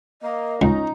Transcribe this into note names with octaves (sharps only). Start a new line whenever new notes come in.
A#3 D#5
C#2 C#4 D#4